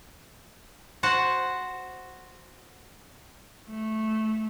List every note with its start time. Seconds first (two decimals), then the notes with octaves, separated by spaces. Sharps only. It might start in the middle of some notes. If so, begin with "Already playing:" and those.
1.03 F#4 C5 F#5 A5
3.69 A3